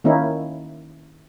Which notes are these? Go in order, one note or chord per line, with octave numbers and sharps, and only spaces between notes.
D#3 A#3 C#4 D#4 E4